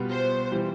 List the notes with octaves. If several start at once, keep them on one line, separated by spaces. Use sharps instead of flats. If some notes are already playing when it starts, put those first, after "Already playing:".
Already playing: B2 G3 B3 F4
C5
E3 G3